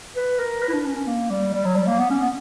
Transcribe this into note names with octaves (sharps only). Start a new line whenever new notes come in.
B4
A#4
B4
E4
D4
C#4
C#4
A#3
G3
G3
F#3
G3
A#3
B3
C#4
B3